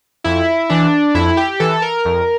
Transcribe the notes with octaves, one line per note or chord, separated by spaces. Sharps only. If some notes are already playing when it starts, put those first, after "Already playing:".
F2 E4
E3 D4
F2 E4
G4
E3 A4
A#4
F2